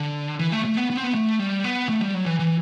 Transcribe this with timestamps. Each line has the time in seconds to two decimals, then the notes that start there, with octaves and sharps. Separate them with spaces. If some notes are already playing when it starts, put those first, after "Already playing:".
Already playing: D3
0.39 E3
0.52 A3
0.65 A3
0.77 B3
0.90 B3
0.97 C4
1.04 B3
1.14 A3
1.39 G3
1.64 B3
1.89 A3
2.01 G3
2.14 F#3
2.26 E3
2.39 E3